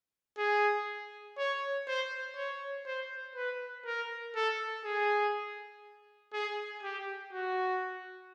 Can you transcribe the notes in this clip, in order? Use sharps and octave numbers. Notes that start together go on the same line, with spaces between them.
G#4
C#5
C5
C#5
C5
B4
A#4
A4
G#4
G#4
G4
F#4